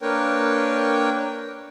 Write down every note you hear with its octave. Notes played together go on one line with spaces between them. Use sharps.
A#3 D4 A#4 B4 C#5 G5